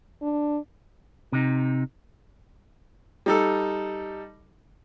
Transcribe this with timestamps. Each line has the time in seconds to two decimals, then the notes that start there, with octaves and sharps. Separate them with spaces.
0.22 D4
1.32 C3 D#4
3.26 G3 D#4 A4